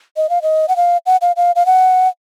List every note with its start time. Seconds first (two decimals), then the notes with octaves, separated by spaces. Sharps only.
0.17 D#5
0.30 F5
0.42 D#5
0.68 F#5
0.76 F5
1.06 F#5
1.22 F5
1.37 F5
1.56 F5
1.66 F#5